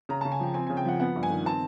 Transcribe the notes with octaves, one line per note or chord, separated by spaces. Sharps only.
C#3 A#5
C#3 A5
G#5
F3 G5
C4 G#5
C#3 G#5
G5
F3 F#5
B3 F#5
G2
G#5
D#3
C4 A5